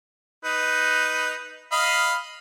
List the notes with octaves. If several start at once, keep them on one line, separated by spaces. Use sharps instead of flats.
D#4 B4
D#5 F5 B5